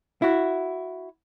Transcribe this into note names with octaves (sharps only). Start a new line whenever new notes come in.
E4 F#4